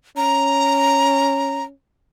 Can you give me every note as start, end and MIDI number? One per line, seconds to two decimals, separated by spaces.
0.17 1.72 61
0.17 1.64 82